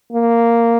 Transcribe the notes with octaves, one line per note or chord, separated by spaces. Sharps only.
A#3